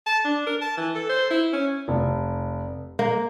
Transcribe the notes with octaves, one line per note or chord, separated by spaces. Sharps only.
A5
D4
A#4
A5
E3
A4
C5
E4
C#4
F1
A#3